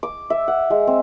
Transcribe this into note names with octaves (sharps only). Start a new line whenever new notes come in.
D6
E5
F#5
G#3
C4